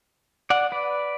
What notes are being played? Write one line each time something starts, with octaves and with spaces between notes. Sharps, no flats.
D5 F#5
B4 D5